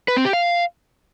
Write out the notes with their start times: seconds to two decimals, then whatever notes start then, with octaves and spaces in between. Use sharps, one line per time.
0.08 B4
0.17 C4
0.25 G4
0.33 F5